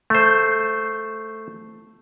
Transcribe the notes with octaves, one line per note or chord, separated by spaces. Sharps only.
A3 C5